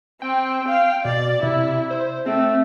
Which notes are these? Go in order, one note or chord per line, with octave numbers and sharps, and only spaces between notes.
C4 G5
F5
B2 D5
C3 E4
C5
A3 C4